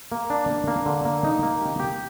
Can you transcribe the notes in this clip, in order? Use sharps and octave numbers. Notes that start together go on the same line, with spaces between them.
A#3
D4
A#3
A#3
D3
A#3
D#4
A#3
G4
G4